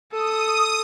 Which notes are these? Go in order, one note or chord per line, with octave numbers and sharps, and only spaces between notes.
A4 D#6